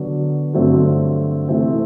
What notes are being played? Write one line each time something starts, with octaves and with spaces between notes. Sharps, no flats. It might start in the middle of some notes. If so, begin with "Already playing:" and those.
Already playing: D3 F#3 B3 D4
G2 D3 F#3 A3 C4
C3 E3 A3 C4